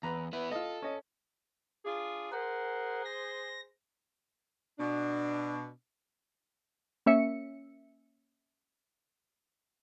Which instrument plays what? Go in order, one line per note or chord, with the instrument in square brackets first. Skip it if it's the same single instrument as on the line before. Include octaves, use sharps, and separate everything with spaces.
[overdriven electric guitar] E2 [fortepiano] B4 A#5
[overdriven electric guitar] B3 E4 [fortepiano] B4
[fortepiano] F4 D#5 [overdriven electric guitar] A4
[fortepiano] C#4 D#5
[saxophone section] D4 F4 G#4
[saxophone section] G#4 C5 [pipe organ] A#4 F#5
[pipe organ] A#6
[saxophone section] B2 D4
[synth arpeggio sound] A#3 C#4 E5 C#7